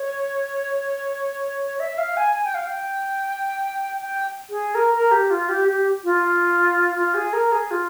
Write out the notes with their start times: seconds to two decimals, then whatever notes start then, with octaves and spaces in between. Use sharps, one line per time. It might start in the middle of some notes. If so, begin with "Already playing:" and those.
Already playing: C#5
1.80 E5
1.98 F5
2.17 G#5
2.36 G#5
2.45 G5
2.55 F5
2.64 G5
4.01 G5
4.50 G#4
4.75 A#4
4.94 A#4
5.11 G4
5.30 F4
5.49 G4
5.68 G4
6.04 F4
6.96 F4
7.14 G#4
7.33 A#4
7.52 G#4
7.71 F4